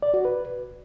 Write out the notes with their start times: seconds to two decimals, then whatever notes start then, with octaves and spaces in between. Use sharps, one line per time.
0.03 D5
0.14 F#4
0.25 B4